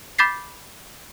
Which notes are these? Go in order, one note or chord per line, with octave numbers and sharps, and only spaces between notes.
B5 D6 G6 A6 B6 C7